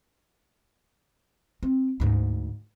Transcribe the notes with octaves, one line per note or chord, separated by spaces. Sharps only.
C4
D2 G#2